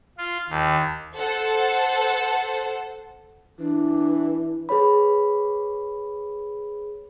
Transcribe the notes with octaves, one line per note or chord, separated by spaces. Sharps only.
F4
D#2
A4 C5 F#5
E3 D4
G#4 B4 C#5 B5